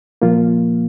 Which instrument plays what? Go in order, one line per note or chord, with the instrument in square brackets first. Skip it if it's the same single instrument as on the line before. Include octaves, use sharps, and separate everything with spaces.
[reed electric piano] A#2 F3 A#3 F4